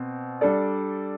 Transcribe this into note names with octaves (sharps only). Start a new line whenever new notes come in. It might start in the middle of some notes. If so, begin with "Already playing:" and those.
Already playing: B2 C4
G3 D4 A4 D5